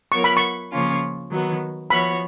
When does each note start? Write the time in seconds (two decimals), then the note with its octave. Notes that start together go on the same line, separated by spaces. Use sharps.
0.12 F#3 B3 F4 A#4 C#5 C#6
0.24 B5
0.37 C#6
0.71 C#3 F3 A#3 C#4 F4
1.31 D#3 F#3 B3
1.90 F3 B3 F#4 C#5 B5